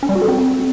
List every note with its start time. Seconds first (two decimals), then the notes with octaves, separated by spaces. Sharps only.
0.03 C#4
0.09 G3
0.15 F#4
0.22 A4
0.28 C4